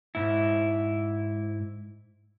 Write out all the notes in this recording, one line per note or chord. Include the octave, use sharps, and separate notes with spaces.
G#2 E4